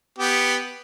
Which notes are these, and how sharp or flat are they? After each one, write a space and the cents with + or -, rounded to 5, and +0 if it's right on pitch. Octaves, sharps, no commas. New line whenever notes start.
B3 +0 G4 +0